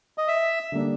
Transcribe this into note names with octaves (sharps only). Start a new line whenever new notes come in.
D#5
E5
D3 G3 A#3 D4